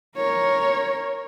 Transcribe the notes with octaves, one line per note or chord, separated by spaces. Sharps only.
A#4 C#5